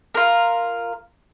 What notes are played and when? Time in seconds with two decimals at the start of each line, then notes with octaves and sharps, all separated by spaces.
0.15 F4 A#4